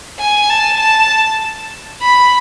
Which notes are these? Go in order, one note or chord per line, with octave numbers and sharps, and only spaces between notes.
G#5
A5
A5
B5